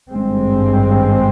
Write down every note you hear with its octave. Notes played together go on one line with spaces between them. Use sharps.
G#1 G2 G#3 C4